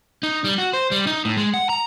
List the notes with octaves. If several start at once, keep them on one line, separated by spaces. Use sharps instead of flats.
D#4
G3
F#4
C5
G3
D#4
A2
G#3
F#5
A#5